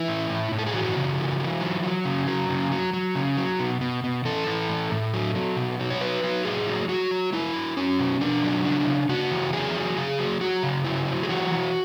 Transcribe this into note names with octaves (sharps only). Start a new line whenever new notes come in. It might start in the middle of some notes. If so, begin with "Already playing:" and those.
Already playing: E3 E4
A2
A2
A2
A4
G#4
E3 F#4
C#3
E3
E3
F#3
F#3
C#3
F#3
C#3
F#3
F#3
C#3
F#3
B2
B2
B2
E3 A4
E3
A2
A2
F#3
F#3
B2
F#3
C#5
F#3 B4
F#3
A2 G#4
F#3
F#3 F#4
F#3
F#3 E4
F#3
F#3 C#4
B2
B2 D4
F#3
C#3 D4
C#3
C#3 F#4
E3
F#3 G#4
F#3
C#3 G#4
F#3
F#3 F#4
C#3
F#3 E4
F#3
G#4
E3 F#4
E3